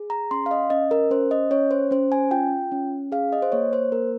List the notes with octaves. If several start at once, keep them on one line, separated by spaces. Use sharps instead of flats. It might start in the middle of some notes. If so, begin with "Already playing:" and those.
Already playing: G#4
A#5
C#4 C6
F5
D#5
C#4 D#5
A#4
C#4 C5
D#5
C#4 C#5
C5
C#4 C5
G#5
F4 G5
C#4
G#4 F5
D#5
C5
A#3 C#5
C5
A#3 A#4